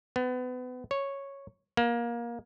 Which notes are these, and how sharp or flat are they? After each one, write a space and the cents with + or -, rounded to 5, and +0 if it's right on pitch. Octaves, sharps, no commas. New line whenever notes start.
B3 +30
C#5 -5
A#3 +20